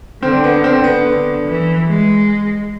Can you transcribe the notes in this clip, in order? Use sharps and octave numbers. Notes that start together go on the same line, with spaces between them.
D3 C4
B3
C4
B3
D3
E3
G#3